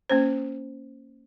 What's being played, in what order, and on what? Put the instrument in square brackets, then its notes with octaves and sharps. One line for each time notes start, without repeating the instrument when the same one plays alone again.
[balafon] A#3 C#4 C5